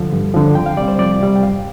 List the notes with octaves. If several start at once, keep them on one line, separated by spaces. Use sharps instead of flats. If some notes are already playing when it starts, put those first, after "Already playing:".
Already playing: D3 F3 A4
G2
D3 F3
F2 G5
F5
C3 G3 D5
C5
F2 D5
C3 G3
G5
G2 F5